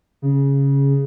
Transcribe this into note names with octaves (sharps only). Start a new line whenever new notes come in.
C#3